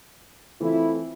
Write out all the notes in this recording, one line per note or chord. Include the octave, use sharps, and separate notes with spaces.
E3 A3 C4 E4 F4 A4